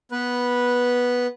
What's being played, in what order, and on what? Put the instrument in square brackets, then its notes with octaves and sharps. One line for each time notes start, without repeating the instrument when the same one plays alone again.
[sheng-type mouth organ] B3 B4